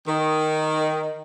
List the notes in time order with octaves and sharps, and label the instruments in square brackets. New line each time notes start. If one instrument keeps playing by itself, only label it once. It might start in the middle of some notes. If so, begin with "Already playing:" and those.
[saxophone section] D#3